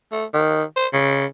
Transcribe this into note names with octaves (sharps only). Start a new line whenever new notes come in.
A3
D#3
C5
C#3